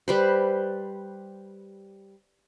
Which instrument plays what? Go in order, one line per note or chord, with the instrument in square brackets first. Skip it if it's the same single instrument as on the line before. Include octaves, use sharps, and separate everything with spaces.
[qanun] G3 B4 C5